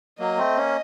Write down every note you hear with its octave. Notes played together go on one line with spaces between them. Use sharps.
F#3 A#3 D#5
A3 C4
A#3 C#4